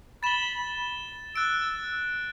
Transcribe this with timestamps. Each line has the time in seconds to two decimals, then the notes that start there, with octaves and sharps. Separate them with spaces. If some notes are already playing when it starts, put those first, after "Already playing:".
0.23 B5 A6 E7 G7
1.35 E6 F#6 A6 D7